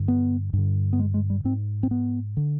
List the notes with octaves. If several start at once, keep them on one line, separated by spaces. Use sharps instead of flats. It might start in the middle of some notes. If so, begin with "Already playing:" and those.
Already playing: G2 D3
B3
G2 D3
B3
G#3
G#3
G3
G#2 C4
C4
B3
D3